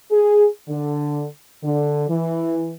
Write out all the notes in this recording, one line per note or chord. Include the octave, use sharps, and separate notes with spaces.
G#4
D3
D3
E3